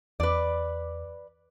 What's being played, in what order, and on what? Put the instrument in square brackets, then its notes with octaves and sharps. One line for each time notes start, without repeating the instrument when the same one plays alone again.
[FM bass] E2 [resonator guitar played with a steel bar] B4 D5